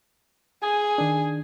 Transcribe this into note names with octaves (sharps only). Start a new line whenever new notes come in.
G#4 G#5
D#3 D4